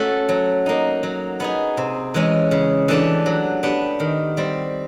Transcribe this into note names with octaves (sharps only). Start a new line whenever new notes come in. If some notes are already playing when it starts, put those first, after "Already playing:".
Already playing: A3 C#4 F#4 A4
F#3
A#3 D#4
F#3
B3 D#4 G#4
C3
E3 G#3 C#4
C#3
E3 A3 D4 G4
F#3
B3 D4 G4
D#3
G3 C4